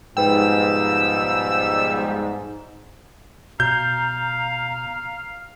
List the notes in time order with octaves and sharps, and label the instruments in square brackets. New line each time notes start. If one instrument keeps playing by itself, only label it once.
[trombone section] G#2 [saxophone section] B2 F3 G3 [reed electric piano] B4 G5 [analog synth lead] E6
[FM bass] B2 [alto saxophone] F5 [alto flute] A#5 [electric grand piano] G6